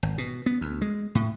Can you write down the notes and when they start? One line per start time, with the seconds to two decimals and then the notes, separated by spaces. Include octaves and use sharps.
0.03 G#1
0.18 B2
0.46 B3
0.61 D2
0.82 G#3
1.15 A2